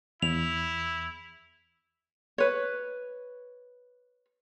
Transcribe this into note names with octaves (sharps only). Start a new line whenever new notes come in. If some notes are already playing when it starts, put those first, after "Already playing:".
E2 E4 F7
B4 C#5